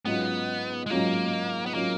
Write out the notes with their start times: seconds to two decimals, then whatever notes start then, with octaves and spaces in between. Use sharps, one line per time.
0.05 G#2 F#3 B3 C#4 F4
0.86 G#3
0.90 G#2 F#3 A#3 C#4 F4
1.66 B3
1.74 F#3 A#3 C#4 F4